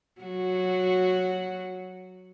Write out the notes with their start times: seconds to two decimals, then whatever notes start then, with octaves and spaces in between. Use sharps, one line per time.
0.21 F#3 F#4